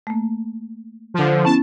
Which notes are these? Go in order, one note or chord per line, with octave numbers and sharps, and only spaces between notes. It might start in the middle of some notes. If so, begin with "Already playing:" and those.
A3 A#3
D3 F3
B3 C#4 E4 A5